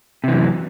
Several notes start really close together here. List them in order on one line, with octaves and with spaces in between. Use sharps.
C3 E3 F#2